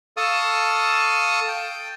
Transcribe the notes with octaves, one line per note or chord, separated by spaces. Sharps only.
A4 F5 A5 C#6 D#6 E6
G5